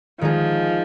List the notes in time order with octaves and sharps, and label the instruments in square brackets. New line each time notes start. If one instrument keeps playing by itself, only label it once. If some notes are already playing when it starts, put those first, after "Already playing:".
[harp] D#3 G#3 D#4 G#4 [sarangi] F3